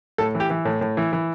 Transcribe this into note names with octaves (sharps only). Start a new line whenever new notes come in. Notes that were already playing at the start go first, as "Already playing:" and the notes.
A2 A4
E3
G4
E3
A2
A2
E3
E3